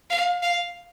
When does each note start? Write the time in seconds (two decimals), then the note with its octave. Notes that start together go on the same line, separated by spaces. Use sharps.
0.10 F5
0.42 F5